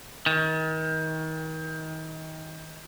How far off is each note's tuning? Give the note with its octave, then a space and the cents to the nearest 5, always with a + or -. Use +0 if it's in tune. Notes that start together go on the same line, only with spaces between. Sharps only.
D#3 +30